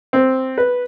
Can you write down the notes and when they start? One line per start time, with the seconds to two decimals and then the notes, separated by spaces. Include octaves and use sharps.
0.13 C4
0.58 B4